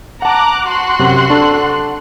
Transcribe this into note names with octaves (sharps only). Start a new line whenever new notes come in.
F#5 A5 A#5 D6 F#6
F#4 C6 F#6
F#2 C3
D4 A4